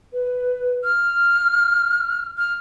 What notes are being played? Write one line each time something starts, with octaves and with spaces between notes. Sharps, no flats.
B4
F6
F6